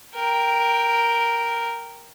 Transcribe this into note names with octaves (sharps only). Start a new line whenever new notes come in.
A#4 G5